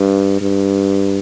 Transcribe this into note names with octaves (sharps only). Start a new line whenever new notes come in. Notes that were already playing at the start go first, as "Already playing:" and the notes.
Already playing: G2
G2